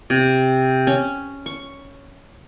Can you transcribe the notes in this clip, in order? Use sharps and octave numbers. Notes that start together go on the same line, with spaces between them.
C3
C#4
C#6